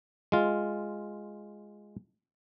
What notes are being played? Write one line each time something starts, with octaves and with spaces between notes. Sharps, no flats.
G#3 F4